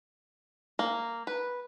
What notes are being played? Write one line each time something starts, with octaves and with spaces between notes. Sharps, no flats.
A#3
B4